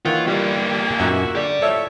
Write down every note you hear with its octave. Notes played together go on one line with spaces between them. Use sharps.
D#3 E3 A#3 F4 C#5 F#5 G5
G3 B3 G4
F#2 A#2 D#4 F#4 E5
D3 G4 D5
A2 F3 A4 C#5 E5